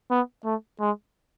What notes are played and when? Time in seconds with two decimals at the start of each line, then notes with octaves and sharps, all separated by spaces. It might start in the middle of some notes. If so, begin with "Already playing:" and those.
0.11 B3
0.45 A3
0.80 G#3